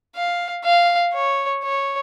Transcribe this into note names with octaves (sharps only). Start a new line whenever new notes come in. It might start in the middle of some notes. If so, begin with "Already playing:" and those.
F5
F5
C#5
C#5